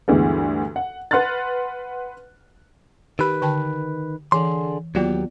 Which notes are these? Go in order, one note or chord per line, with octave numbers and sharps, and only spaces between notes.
D2 G2 E3 G#3 B3
F#5
B4 F#5 C6 F6 F#6 A6
D#3 G4 B4 B5
D3 G5 A5
D3 E3 G#4 C6
D#2 F#3 B3 F4 G4 D5